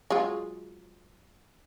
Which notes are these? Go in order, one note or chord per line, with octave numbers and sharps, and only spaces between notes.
F#3 G#3 F4